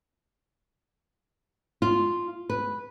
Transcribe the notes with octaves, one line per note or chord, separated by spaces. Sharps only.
F4
B4